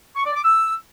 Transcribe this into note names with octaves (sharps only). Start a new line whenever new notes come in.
C#6
D5
D6
E6